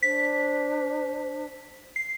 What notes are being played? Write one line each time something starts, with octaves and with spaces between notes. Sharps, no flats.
D4 C5 B6
C7